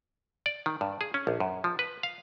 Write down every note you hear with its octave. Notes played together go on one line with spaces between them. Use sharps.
D5
D#3
G2
G#4
C#4
A#1
F#2
F3
B4
F5